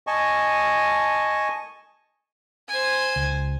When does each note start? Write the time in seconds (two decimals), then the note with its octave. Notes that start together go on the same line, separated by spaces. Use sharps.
0.07 D#5 G#5 A5 C#6
2.69 C5 G#5
3.16 C#2